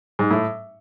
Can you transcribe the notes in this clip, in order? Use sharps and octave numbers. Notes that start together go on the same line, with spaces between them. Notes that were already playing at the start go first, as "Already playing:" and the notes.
G#2
A2